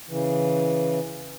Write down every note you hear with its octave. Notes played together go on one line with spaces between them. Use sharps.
C#3 E3